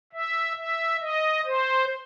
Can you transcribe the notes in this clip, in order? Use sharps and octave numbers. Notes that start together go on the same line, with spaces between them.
E5
E5
D#5
C5